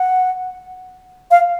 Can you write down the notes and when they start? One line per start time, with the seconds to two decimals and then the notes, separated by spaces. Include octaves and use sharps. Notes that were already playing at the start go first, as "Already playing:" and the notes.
Already playing: F#5
1.31 F5